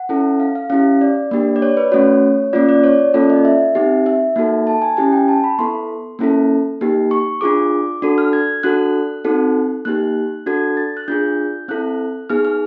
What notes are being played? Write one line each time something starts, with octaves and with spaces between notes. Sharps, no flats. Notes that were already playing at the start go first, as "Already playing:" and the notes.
Already playing: F#5
C#4 E4 A4
F5
F5
C#4 E4 G4 F5
D5
A#3 D4 G4
D5
C#5
B4
A3 C#4 F#4 C#5
A#3 C#4 F4 D5
D5
C#5
A#3 C#4 F4 A4 D5
D#5
E5
C4 D#4 G4
E5
A#3 D#4 F#4 A4
A5
G#5
C#4 E4 G4 G#5
G5
A5
B5
B3 E4 A4 C6
A#3 C#4 E4 A4
A#3 D#4 G4
C#6
D4 F4 G#4 D6
D4 F#4 A4
F6
G#6
D4 F#4 A4 F#6
C4 D#4 F#4 A4
A#3 D#4 G4 F#6
D4 F#4 A4 G#6
A6
F#6
D4 F4 G#4 G6
C4 E4 A4 F#6
B3 D#4 G#4 F6
F6